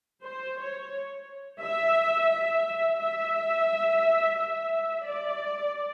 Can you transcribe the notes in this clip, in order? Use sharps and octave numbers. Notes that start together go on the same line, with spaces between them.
C5
C#5
E5
E5
E5
E5
D5